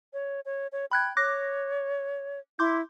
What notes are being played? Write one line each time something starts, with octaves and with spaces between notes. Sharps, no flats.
C#5
C#5
C#5
G5 B5 F#6 G#6
C#5 D6 F#6 A#6
E4 C6 D6 G6